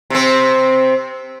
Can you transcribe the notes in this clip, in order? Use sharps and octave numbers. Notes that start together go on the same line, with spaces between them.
C3 C4